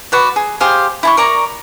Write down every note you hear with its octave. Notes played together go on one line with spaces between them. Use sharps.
F#4 B4 D5
G#4
G4 G#4 C5 F5
E4 A5 C#6
A#4 D5 A#5 C#6